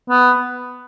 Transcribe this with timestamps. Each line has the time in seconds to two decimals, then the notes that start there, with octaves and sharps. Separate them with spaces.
0.10 B3